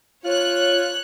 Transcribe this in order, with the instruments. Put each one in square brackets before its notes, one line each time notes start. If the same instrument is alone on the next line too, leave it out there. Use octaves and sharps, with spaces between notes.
[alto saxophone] F4 [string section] C#5 F#6